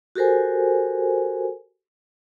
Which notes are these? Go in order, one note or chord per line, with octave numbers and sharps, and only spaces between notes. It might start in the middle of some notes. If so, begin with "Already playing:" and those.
F#4 G4 A4 A#4 C5 G#5